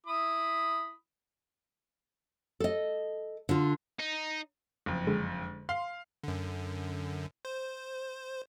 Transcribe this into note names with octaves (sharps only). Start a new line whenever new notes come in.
E4 B5 D#6
A4 D#5
D3 F4
D#4
F#1 F2
D3 G#3
F5 C6
F#2 D3
C5